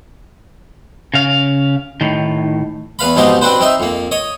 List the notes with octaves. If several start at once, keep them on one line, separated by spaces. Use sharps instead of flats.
C#3 F5
A2 D#3
E2 B4 F5 B5
G#2 B2 F3 C4 D#4 G4
C4 D4 F#4 B4 C5
C4 D#4 E5
F2 A#3
C#5 D#5